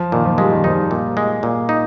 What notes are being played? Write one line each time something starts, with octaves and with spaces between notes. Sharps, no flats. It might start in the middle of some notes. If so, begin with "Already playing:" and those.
Already playing: F3
A#2 D#3
F3
G3 G#3
D#3
F3 D#4
G3
A#2
G#3
A#2
D#4